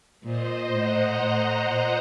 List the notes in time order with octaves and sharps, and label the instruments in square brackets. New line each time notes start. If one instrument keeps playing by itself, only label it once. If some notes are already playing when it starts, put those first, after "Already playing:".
[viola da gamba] A#2 [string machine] C5 D#5
[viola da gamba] A2 [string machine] F#5 A#5
[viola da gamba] A2
A#2